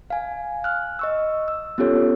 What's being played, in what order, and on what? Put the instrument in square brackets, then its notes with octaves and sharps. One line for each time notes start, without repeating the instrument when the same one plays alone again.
[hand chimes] F5 G#5
F6 F#6
D#5 C#6 E6
E6
B3 C#4 F4 G4 A4 C#5